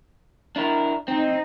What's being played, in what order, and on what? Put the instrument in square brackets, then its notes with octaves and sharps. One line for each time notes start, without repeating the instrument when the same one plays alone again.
[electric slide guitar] D4 E4 A#4
[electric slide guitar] C4 [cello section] D#4